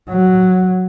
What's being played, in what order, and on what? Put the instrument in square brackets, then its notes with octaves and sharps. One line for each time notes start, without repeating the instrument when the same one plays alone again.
[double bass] F#3